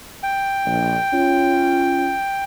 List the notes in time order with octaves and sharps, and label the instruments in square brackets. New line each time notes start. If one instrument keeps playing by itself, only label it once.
[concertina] G5
[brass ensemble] A#1
C#4 F4